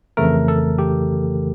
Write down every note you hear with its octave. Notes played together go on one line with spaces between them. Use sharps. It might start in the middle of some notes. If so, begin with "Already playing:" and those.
F2 C#3 E3 A3 A#4
A4
G4